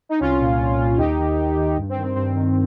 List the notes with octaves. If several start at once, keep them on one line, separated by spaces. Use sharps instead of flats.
D#4
C2 C#4 F4
A#2
C2
A#2
D#2 D#4 G4
D#3
D#2
D#3
G2
C4
D#3
C4
G2 C4
D#3